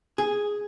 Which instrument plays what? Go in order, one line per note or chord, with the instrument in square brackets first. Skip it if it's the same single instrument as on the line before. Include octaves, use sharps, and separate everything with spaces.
[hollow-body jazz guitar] G#4